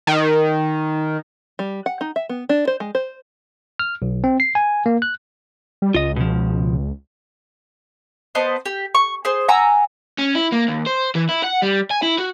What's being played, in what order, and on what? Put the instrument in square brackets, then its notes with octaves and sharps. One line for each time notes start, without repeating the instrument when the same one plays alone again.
[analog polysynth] D#3
[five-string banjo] G3
F#5
D#4
E5
B3
D4
C5
G#3
C5
[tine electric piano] F6
B1
C4
C7
G#5
A#3
F#6
[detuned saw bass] G3
[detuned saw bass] C#2 [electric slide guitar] F4 D#5
[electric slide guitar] B2 F3
[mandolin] B3 C5 D#5 A5
G4
C#6
G#4 C5
F#5 G#5 A#5 E6
[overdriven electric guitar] C#4
E4
A#3
D#2
C5
E3
E4
F#5
G3
G#5
E4
F#4